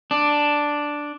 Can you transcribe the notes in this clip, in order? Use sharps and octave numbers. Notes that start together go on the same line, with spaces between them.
D4